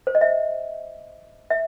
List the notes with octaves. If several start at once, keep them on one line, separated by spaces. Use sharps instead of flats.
C5
D#5
E5
E5